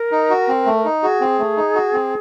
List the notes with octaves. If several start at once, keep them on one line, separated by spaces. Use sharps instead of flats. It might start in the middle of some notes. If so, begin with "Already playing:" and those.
Already playing: A#4
D#4
F#4
C4
A3
D#4
F#4 G#4
C4
A3
D#4
F#4
C4